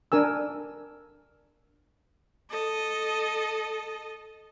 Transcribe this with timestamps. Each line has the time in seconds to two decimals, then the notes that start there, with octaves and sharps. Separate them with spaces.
0.12 D4 A#4 G#5 E6
2.50 A4 D#5